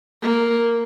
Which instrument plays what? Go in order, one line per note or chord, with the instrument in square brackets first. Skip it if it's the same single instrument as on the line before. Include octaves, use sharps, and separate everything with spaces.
[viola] A#3